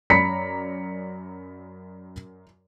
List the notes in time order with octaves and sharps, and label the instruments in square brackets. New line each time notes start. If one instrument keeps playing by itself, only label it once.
[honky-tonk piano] F#2 D5 A#5 [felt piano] B5 B6 C#7